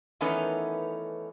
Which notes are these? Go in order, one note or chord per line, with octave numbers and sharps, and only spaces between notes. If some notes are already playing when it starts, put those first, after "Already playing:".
D#3 E3 A3 B3 C#4 D#4